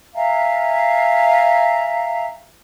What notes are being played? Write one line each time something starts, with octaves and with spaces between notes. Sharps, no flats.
E5 F5 G#5 A#5